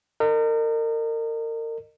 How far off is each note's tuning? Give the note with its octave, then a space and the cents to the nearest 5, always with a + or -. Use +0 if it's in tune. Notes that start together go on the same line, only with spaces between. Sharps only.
A#4 -35 D#5 -35